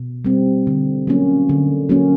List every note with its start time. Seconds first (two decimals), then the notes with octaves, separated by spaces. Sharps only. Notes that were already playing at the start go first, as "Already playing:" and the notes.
Already playing: B2
0.25 G3 C4
0.67 D3
1.07 F#3 A#3 C#4
1.49 D3
1.89 F#3 A#3 C#4